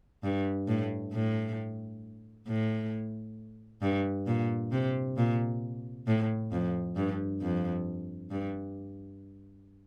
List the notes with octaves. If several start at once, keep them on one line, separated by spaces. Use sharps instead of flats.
G2
A2
A2
A2
G2
A#2
C3
A#2
A2
F2
G2
F2
G2